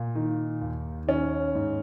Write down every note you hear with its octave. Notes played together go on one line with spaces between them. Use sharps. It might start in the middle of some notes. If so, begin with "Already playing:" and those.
Already playing: A#2
D#3
D#2
D#3 C#4
G#2